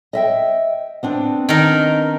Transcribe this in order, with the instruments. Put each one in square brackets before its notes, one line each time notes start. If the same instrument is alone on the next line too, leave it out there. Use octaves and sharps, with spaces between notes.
[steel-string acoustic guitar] D#5 E5 G5
B3 C4 D4
[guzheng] D#3 A#4